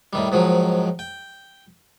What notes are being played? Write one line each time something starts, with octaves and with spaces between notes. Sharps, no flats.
A2 D#3 G3
G#2 D#3 F3 F#3
G5